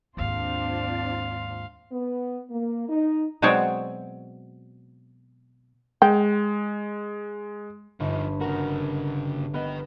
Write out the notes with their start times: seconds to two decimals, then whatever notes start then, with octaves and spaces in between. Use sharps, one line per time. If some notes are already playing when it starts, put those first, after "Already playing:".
0.17 D#2 G#2 C4 D4 F4 F5 C6
1.92 B3
2.51 A#3
2.89 D#4
3.42 B2 F#3 G#3 C4 C#5 D5
6.02 G#3 G5
8.00 G1 F3 D#4
8.41 C#3 F#4 A#4
9.54 B3 A#4 D#5